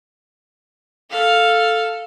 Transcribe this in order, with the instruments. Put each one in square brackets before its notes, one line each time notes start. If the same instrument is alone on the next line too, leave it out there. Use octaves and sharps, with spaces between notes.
[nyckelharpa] A4 F5